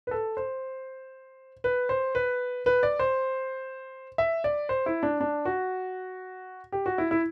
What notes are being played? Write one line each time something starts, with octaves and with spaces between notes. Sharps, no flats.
B4
A4
C5
B4
C5
B4
B4
D5
C5
E5
D5
C5
E4
D4
D4
F#4
G4
F#4
E4
E4